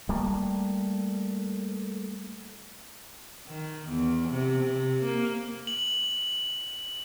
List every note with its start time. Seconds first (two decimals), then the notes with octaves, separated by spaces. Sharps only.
0.09 G3 A3 A#3
3.47 D#3
3.88 E2
4.30 C3
4.60 C3
5.03 A#3
5.67 F#7